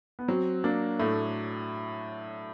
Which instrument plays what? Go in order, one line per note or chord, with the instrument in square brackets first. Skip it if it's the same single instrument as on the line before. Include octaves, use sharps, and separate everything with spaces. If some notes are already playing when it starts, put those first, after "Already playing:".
[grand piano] B3
[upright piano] F#3 [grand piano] C4
[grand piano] A#3 [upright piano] D4
[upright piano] A2 [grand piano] A3